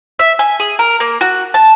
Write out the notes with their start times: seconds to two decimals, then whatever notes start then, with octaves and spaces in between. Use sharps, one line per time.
0.19 E5
0.39 G#5
0.60 G#4
0.79 A#4
1.00 A#3
1.21 F#4
1.54 A5